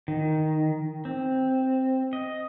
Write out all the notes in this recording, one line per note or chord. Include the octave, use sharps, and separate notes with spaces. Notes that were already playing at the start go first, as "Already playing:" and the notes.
D#3
C4
D#5